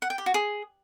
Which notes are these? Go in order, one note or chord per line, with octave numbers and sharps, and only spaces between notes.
F#5
G5
G4
F#4
G#4